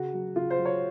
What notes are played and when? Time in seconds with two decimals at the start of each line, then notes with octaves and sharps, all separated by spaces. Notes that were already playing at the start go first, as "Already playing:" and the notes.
Already playing: C#3 F#4
0.14 F#3
0.36 C#3 F4
0.51 C5
0.58 F#3
0.65 C#5